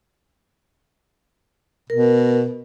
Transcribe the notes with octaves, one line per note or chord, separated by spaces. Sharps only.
B2 A#4